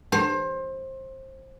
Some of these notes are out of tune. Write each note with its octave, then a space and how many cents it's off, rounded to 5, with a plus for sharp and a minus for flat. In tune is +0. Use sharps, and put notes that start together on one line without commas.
C5 +25